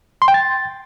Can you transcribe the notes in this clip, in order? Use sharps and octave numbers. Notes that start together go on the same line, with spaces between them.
C6
G5
A6